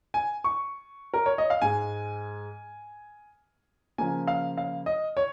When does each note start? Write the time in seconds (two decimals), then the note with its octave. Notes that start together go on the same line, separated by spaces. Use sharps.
0.14 G#5
0.44 C#6
1.14 A#4
1.26 C#5
1.38 D#5
1.50 F5
1.62 G#2 G#3 G#5
3.98 C#3 F3 A#3 G#5
4.27 F5
4.57 F5
4.86 D#5
5.17 C#5